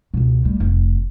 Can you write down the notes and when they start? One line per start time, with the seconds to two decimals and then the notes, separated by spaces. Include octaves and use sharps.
0.14 C#2 B2
0.45 G3 A3
0.60 F1